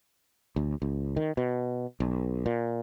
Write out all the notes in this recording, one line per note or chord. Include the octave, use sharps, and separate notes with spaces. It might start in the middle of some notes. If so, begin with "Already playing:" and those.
D2
C#2
D#3
B2
B1
A#2